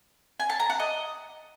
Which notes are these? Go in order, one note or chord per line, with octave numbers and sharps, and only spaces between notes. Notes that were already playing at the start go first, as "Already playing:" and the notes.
G#5
A5
A#5
F#5
D#5